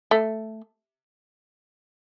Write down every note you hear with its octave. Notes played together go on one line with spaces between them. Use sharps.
A3